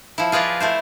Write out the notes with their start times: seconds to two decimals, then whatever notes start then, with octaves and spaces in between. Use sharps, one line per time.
0.18 F3 E4
0.32 F4 G#4 B4 D5 D#5 F5
0.60 A3 E4 C5